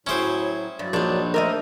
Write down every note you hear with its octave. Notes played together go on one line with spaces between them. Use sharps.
A2 F#3 C#4 E4 G#4 C5 G5
G2 F#3 D5
A#1 D4 D#4
A3 A4 A#4 C5 D5 D#5